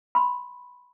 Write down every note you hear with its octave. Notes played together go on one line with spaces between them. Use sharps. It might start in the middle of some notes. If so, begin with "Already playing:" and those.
B5 C6